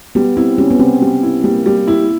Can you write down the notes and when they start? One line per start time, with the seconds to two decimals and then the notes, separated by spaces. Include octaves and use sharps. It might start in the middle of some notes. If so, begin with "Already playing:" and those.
0.15 G3 B3
0.37 C4 E4
0.58 G3 C#4
0.71 B3
0.79 G3 C4
1.02 G3
1.23 E4
1.44 G3 A#3
1.66 G3
1.88 E4